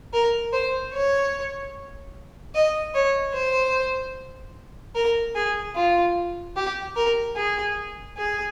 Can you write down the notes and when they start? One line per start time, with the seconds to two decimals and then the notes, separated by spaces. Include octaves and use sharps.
0.13 A#4
0.53 C5
0.93 C#5
2.55 D#5
2.94 C#5
3.34 C5
4.95 A#4
5.35 G#4
5.76 F4
6.57 G4
6.96 A#4
7.36 G#4
8.17 G#4